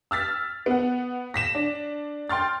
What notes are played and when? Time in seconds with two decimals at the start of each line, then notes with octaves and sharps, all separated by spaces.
0.11 E6 F6 A6 B6
0.66 B3 F#5
1.34 A#6 B6 E7
1.55 D4
2.29 G5 C6 F6 A6